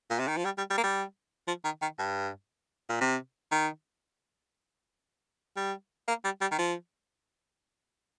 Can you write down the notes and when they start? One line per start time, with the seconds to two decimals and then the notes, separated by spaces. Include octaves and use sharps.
0.10 A#2
0.19 C3
0.28 D#3
0.37 F3
0.45 G3
0.58 G3
0.70 G3
0.78 A#3
0.83 G3
1.47 F3
1.64 D#3
1.82 D#3
1.99 G2
2.89 A#2
3.01 C3
3.52 D#3
5.56 G3
6.08 A#3
6.24 G3
6.41 G3
6.52 D#3
6.58 F3